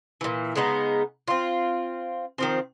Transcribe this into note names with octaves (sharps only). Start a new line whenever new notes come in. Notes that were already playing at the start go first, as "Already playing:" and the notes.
A#2 E3
C#3 G#3 B3 D#4
C4 F4
D#3 F3 C4